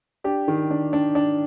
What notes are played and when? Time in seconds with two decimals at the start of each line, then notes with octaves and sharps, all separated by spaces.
0.24 D4 G4
0.48 D#3
0.71 D4
0.93 D4
1.15 D4